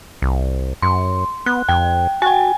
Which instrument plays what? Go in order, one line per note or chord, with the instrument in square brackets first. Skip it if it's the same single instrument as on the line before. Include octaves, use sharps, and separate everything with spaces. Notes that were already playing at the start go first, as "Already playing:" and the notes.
[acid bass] C2
[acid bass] F#2 [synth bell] C6
[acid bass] B3 [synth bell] F#6
[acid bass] F2 [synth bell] G5
[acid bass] F#4 [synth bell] G5 G#5